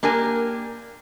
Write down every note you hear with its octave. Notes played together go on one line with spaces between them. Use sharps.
A#3 D4 G4 A#4 G#5